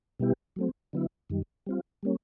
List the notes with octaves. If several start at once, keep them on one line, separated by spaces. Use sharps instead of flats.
B2 G3 B3 E4 G4
F#3 A3 C4
D3 F#3 B3 E4
F#2 D#3 G3
G3 C4 F4
G3 A#3 C#4